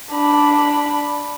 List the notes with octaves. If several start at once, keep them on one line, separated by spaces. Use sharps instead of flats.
D4 B5